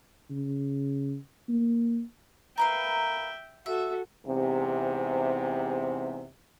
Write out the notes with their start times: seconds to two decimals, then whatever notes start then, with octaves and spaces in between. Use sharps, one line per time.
0.30 C#3
1.49 A#3
2.58 A#4 B4 E5 F5 G5
3.66 F#4 A4 E5
4.26 E2 G#2 C3